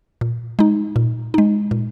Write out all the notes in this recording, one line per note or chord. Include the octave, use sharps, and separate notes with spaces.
A#2
G#3 D#4
A#2
G#3 D#4
A#2